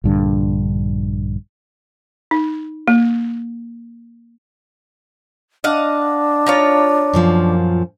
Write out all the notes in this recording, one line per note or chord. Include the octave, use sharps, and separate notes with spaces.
A#1 G2 D3
D#4
A#3
D4 D#5 F5 F#5
D#4 F4 C#5
F#2 A#2 F3